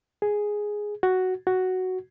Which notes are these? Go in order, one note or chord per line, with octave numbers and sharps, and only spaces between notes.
G#4
F#4
F#4